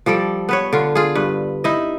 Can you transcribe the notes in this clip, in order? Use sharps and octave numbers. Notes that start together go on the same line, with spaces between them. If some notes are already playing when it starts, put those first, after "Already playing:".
F3 G3 A4 D5
B3 B4 C#5
D3 F4
F4 G#4
G2 B4
D#4 E4 D#5